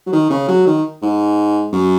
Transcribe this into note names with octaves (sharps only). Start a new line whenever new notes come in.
F#3
D#3
C#3
F#3
D#3
G#2
F#2